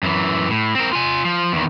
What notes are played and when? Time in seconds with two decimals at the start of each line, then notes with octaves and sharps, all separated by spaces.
0.03 F#2 E3
0.50 A2
0.75 C4 A#4
0.93 F4 G#5
1.25 F3
1.53 E2 D#3